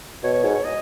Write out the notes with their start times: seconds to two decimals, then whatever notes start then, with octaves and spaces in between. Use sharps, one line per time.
0.23 B2 C#5
0.34 C#5
0.44 G#2 C#5
0.55 C#5
0.65 D#5